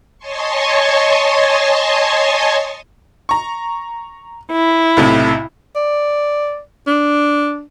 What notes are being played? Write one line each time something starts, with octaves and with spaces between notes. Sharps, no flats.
C#5 D#5 G#5 A5 C6 C#6
A#5 C#6
E4
B1 A2 C3
D5
D4